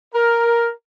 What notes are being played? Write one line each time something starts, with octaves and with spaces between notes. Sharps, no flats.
A#4